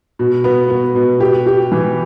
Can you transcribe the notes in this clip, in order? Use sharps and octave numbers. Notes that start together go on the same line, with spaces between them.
B2
B3
B3
B2
G4
G4
E3